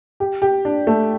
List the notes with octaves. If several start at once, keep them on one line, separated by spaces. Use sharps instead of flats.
G4
G4
D4
A3